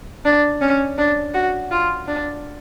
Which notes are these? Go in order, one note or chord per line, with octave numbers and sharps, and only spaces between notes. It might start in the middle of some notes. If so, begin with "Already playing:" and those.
D4
C#4
D4
F#4
F4
D4